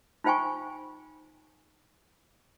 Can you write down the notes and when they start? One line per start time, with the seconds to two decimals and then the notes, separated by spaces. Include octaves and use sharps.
0.24 D#4 F4 C5 G5 G#5 C#6